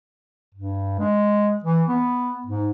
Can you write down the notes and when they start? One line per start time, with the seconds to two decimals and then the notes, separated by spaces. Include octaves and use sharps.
0.54 G2
0.99 G#3
1.64 E3
1.88 B3
2.47 G#2